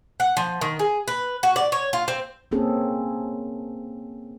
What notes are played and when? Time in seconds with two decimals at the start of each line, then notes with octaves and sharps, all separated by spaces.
0.20 F#5
0.37 F3
0.61 D#3
0.79 G#4
1.08 B4
1.43 F#4
1.56 D5
1.72 C#5
1.93 F4
2.08 C4
2.51 A#3 C4 C#4 G#4 A4